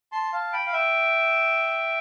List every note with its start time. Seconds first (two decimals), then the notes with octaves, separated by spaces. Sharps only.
0.12 A5 C6
0.32 F5 A5
0.52 G5 B5
0.66 F5
0.73 E5 G5